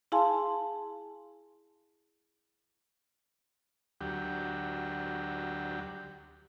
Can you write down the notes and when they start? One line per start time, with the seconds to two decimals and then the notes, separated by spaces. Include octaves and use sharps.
0.12 E4 G#4 F5 G#5 A5 C6
4.01 D2 F#3 G4